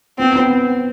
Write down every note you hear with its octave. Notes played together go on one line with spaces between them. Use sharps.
B3 C4
B3